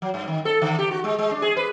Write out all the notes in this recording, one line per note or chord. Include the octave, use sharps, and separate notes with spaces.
F#3
G2
D#3
A4
D3
G4
F#4
G#3
G#3
D4
G#4
B4